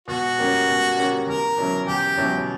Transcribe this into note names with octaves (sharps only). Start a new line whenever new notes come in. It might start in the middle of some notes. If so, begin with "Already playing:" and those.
B2 F#4
G3 A#3 C#4
B2
G3 A#3 C#4
E2 A#4
B2 F#3 C#4 E4
E2 G4
B2 F#3 C#4 E4